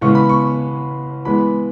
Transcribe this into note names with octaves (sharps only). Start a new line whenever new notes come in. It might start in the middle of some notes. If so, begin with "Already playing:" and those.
C#3 E3 G#3 B3 C#6
B5
C#6
E3 G#3 B3 B5